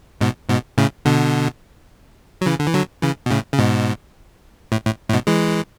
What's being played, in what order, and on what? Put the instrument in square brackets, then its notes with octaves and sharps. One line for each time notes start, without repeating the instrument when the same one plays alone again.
[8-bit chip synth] G#2 B2
G#2 B2
A2 C#3
B2 D3
F#3
C#3 E3
D3
E3
D3 F#3
C#3 E3
B2
A2 C#3
C#3
G#2 B2
A2
A2
A2
G#2 B2
E3 G#3